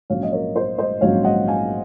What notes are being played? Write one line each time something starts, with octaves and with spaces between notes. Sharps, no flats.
A#1 G#2 F#3 C#4 C#5 F5
D#5
A#4 C#5
C5
C5 D#5
A#1 G#2 F#3 C#4 C#5 F5
D#5 F#5
F5 G#5